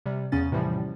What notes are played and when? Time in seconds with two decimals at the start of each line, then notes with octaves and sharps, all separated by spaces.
0.06 C3 G3
0.32 E2 C#3 C#4 A6
0.52 A2 C3 E3 F3 G3